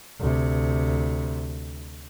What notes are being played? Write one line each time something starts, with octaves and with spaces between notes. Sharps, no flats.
D2 C3